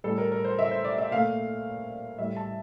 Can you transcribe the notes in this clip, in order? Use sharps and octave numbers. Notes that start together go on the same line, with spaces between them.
A2 G3 A4
A#4
A#4
C5
E5
C5
D5
E5
A#2 A3 F5
A2 G3 E5
A5